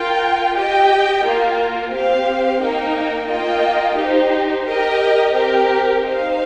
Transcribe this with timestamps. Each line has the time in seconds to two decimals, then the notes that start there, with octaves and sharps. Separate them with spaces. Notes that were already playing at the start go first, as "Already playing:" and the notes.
Already playing: F4 A#4 G5
0.56 G4 D#5 G5
1.24 A#3 F4 A#4
1.92 C4 G4 C5 F5
2.61 A#3 D#4 A#4 G5
3.28 A#3 F4 D#5 G5
3.97 D#4 G4 C5
4.65 G4 A#4 D#5 G5
5.34 C4 G4 A#4
6.02 D#4 C5 F5